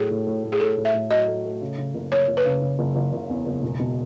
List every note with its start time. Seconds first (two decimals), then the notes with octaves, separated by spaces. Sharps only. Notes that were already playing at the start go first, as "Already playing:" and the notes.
Already playing: A2 F#3 A3 G#4
0.10 A2
0.27 A2
0.44 A2
0.52 G#4
0.60 A2 A4
0.77 A2
0.85 E5
0.94 A2
1.10 F#3 D#5
1.28 A3
1.44 A3
1.61 C#3
1.78 C#3
1.94 F#1
2.12 F#1 C#5
2.28 F#1
2.37 B4
2.45 C#3
2.62 C#3
2.79 F#1
2.96 F#1
3.13 F#1
3.30 E2
3.46 F#1
3.63 E1
3.79 B2